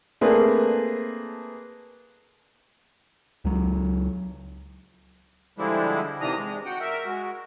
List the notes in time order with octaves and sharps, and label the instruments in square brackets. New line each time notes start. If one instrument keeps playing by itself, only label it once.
[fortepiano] A3 A#3 C4 D4 G#4 B4
[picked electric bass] C#2 F#3
[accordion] D3 F3 G3 G#3 D4 E4
C3 D#3 E3 D4 A#5 D#6
G#3 D4
F#4 F#5 G5
A#4 E5
G#3 F#4